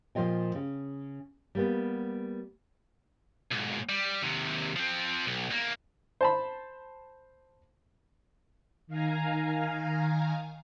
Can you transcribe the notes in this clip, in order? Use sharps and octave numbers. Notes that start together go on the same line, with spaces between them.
A#2 F3 F4 D#5 G5
C#3
G3 A#3 B3
B1 G#2
G3
D#2 C3
F3 C4
B1
E2 A#3
C5 A5 B5
D#3 F5 G#5 A#5